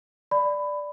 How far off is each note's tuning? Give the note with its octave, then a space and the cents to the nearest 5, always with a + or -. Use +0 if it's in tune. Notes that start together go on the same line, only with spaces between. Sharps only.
D5 +0 B5 +15